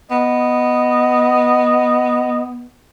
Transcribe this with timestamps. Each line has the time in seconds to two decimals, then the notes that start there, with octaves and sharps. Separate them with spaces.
0.10 B3 D#5